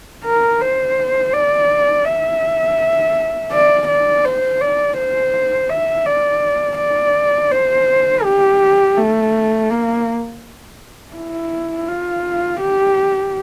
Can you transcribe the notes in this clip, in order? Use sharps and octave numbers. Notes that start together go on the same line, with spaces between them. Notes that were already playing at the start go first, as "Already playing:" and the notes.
A#4
C5
D5
E5
D5
D5
C5
D5
C5
E5
D5
D5
C5
G4
A3
A#3
E4
F4
G4